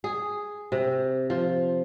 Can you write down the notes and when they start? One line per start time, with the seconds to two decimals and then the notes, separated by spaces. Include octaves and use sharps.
0.04 G#4
0.72 C3
1.30 F3